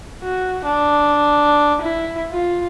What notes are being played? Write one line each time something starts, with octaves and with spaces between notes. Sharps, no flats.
F#4
D4
E4
F4